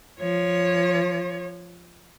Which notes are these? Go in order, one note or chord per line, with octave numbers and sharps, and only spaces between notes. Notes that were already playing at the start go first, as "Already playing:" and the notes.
F3 C#5